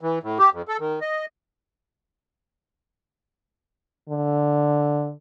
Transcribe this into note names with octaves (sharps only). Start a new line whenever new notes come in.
E3
A2
G4
F2
A4
D#3
D#5
D3